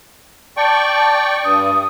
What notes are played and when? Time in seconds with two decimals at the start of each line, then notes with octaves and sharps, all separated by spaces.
0.57 D5 G5 A5 C#6
1.44 G2 D#6